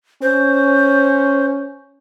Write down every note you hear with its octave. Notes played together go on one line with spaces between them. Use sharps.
C#4 C5